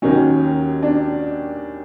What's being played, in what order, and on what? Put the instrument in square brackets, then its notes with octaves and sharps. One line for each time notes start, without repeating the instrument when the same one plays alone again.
[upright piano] D#2 D#3 F#3 C#4
D4